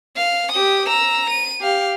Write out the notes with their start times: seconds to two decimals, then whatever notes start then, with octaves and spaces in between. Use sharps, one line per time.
0.16 F5
0.51 G4 D#6
0.88 A#5 E6
1.30 D#7
1.61 G4 F5